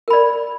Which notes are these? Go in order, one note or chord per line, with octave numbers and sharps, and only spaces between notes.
A#4 D5 B5